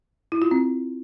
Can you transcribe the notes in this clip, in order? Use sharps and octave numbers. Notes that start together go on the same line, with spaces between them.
E4
F4
C4